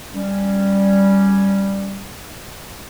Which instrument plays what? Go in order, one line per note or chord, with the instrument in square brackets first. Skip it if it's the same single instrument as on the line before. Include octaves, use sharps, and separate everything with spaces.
[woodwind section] G3 C#4